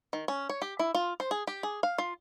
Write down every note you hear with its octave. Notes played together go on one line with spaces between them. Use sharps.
D#3
C#4
C#5
G4
E4
F4
C5
G#4
G4
G#4
F5
F4